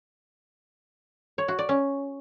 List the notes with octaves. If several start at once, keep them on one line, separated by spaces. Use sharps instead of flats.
C#5
F#4
D5
C#4